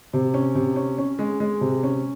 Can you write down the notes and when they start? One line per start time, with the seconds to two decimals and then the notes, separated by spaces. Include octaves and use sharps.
0.13 C3
0.34 C#4
0.55 C3
0.76 C#4
0.98 C#4
1.19 G#3
1.40 G#3
1.61 C3
1.83 C#4